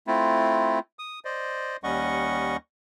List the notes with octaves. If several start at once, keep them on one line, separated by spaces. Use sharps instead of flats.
A3 C4 E4 F4
D#6
C5 D5 D#5
D#2 G3 C#4 D#5 F#5 C#6